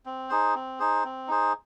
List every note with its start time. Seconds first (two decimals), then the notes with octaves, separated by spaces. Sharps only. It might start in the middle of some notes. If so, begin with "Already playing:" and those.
0.06 C4
0.29 D#4 G#4 C5
0.55 C4
0.79 D#4 G#4 C5
1.04 C4
1.28 D#4 G#4 C5